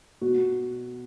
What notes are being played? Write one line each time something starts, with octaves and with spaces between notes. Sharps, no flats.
B2 F#4